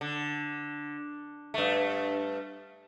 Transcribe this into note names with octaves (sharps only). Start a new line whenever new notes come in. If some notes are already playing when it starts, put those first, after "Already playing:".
D3
G2 A3